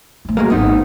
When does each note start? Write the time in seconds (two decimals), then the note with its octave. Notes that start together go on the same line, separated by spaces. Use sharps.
0.25 A3 F4
0.37 F#3 G#3 A#3
0.50 D#1 G#1 B3 C4 D#4